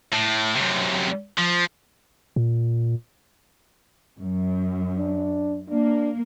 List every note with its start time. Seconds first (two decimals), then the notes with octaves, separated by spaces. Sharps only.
0.13 A2
0.56 F#2 C3
1.38 F3
2.36 A#2
4.20 F#2
4.98 D4
5.70 A#3 D4